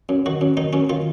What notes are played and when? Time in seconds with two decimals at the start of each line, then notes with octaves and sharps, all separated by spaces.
0.09 F#2
0.26 D#3 F#4
0.41 F#2
0.57 D#3 D#4
0.73 F#2 C#4
0.90 D#3 F4